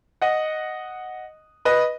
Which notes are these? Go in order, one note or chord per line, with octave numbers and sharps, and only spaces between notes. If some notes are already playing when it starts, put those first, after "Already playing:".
D#5 F#5
B4 D#5